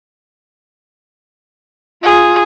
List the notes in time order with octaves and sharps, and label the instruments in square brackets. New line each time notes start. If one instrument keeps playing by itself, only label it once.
[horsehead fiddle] F4 [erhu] G#4